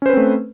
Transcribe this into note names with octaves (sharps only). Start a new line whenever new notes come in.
A3 C4 C#4 B4 C5